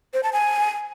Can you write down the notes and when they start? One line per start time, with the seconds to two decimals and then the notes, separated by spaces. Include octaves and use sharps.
0.14 C5
0.23 A5
0.33 G#5